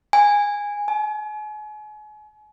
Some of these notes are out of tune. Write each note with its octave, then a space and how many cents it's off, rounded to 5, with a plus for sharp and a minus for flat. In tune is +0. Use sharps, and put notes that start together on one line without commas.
G#5 -15
G#5 +35